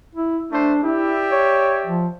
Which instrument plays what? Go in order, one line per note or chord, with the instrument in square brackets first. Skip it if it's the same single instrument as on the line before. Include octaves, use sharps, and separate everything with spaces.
[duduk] E4
[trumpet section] A3 C5 [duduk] D4
[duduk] E4 [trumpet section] G4 D5 E5
[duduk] C#5
F3